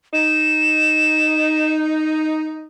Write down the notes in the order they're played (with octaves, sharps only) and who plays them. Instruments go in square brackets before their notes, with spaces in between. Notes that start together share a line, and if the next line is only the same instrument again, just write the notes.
[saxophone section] D#4 [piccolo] E7